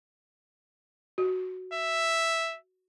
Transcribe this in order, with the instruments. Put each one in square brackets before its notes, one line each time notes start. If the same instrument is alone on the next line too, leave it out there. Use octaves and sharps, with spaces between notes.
[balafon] F#4
[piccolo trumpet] E5